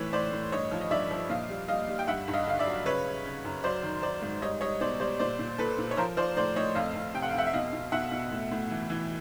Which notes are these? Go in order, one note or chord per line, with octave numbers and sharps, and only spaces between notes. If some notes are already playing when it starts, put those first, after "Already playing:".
Already playing: A2 E3 B4 C#5
A2 C5 D5
A2
G2 C#5 D#5
F3
D#5
G2 D5 E5
F3
A#2 D#5 F5
G3
G3 D#5 F5
G3
G5
G2 E5 F#5
G2
D#5 F5
D3 F5
D5 E5
F#3
C#3 B4 C#5
C#3
C#3
F#2
F#3 C5 D5
D#3
F#3 C5 D5
G#2
G3 C#5 D#5
G3 C#5 D#5
B2 C5 D5
G3 C5 D5
A#2 C5 D5
A#2
A#2 A4 B4
A#2
C#5
F3 A#4 C5
F3 C5 D5
A2 C5 D5
A2 C#5 D#5
F2 D#5 F5
F2
C3 G5
F#5
F5
F2 E5 F#5
E5
B2 D#5 F5
B2
B2 E5 F#5
B2
A2
A2
E3
E3